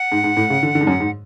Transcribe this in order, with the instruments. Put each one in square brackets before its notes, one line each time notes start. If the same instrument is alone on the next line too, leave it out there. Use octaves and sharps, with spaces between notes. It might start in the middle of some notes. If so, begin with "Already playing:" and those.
Already playing: [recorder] F#5
[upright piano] G#2
G#2
A2
C#3
D3
D3
G#2
F#2
G#2